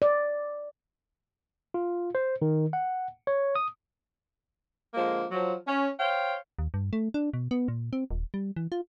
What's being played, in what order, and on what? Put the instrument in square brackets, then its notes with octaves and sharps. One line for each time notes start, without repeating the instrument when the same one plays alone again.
[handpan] D5
[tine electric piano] F4
C5
D#3
F#5
C#5
D#6
[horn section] D3 F3 G#3 A#3
F3 F#3
C#4
C5 C#5 F5 G5
[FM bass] D#2
G2
A3
D4
B2
B3
A#2
C4
D#1
G3
E3
F4